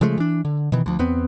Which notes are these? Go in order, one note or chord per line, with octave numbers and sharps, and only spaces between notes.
C#3 F3 G#3 A3
E3 D4
D3
B2 D#3 E3
D2 F3
E2 B3 C4